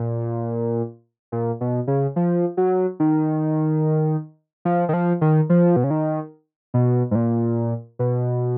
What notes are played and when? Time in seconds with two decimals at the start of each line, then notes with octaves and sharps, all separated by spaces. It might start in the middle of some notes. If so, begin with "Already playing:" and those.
Already playing: A#2
1.32 A#2
1.61 B2
1.87 C#3
2.16 F3
2.57 F#3
3.00 D#3
4.65 F3
4.89 D#3
4.93 F3
5.21 D#3
5.50 F3
5.76 B2
5.84 C#3
5.90 D#3
6.74 B2
7.11 G#2
7.15 A#2
7.99 B2